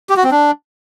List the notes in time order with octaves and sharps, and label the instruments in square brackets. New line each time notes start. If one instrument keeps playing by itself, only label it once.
[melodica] G4
F#4
C4
D4